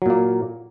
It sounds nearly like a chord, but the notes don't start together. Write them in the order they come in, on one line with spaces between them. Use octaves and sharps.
F#3 A#2 A#3